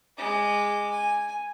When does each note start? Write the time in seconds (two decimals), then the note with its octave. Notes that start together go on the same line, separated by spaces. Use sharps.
0.18 G#3 D6
0.91 G#5